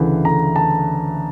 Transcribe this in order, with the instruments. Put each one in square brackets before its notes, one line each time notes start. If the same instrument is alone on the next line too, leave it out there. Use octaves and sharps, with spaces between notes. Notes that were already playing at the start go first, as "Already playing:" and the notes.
Already playing: [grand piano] D2 C#3 E3
D2 A#5
A5